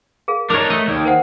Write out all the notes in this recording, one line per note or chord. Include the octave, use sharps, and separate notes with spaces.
G#4 A#4 F5
D4 D#4 A#4 C#5 D6
A3 D#5
D#2 D5
A#4 C5 F#5